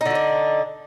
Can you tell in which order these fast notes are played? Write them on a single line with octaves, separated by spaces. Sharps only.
D#4 D3 F#4 D4